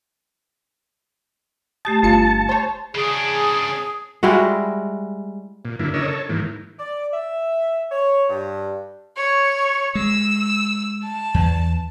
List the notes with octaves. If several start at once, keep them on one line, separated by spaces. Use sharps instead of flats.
A3 G4 A5 D#6
G1 A3 F4 C#7
C5 C#5
C#3 D4 G#4
G3 G#3 E4 F#4
A#2
F#2 D3 A#3 E4
C#3 D4 A#4 C#5 D#5 E6
A4 C#5
G#2 D#3 E3 A#3
D5
E5
C#5
G2
C#5
G#3 E6
A5
E2